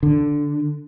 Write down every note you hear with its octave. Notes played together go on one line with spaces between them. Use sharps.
D3